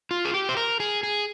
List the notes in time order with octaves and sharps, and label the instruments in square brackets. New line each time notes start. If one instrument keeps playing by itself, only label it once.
[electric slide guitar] F4
G#4
G4
C5
A#4
G#4
G#4